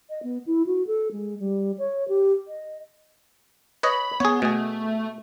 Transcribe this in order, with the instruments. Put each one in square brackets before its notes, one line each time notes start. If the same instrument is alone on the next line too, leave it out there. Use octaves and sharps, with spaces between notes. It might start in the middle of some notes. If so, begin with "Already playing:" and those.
[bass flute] D#5
B3
E4
F#4
A4
G#3
G3
C#5
G4
D#5
[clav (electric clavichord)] B4 C#5 D#5 [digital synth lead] B5
[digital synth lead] B3 [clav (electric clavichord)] G#4 C#5
[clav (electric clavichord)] B2 G#4 [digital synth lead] A3